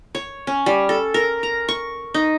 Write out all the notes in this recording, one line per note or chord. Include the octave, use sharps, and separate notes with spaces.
C#5
C#4
G3
A4
A#4
A#5
C#6
D#4